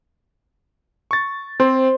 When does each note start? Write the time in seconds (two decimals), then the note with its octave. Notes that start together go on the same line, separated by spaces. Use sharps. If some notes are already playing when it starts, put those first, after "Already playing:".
1.11 C#6 A6
1.60 C4 C5